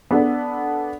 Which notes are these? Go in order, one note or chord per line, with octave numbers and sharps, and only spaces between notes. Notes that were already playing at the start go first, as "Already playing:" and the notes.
B3 D4 A4